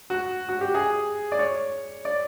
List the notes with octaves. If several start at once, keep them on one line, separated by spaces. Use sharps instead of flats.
F#4
F#4
G4
G#4
D5
C#5
D5